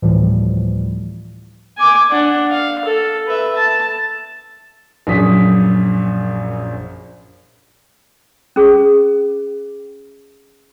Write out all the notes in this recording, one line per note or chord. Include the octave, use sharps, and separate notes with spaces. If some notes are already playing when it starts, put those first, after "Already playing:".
D2 A2 E3 F3 G3
G#5 D6
D4 F#5
F5
A4
B4 E5
A5
A#1 F#2 G#4 D#6 B6
C#4 G#4